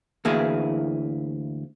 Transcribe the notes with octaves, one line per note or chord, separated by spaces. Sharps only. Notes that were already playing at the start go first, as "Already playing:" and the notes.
D2 E3 A#3 E4 G#4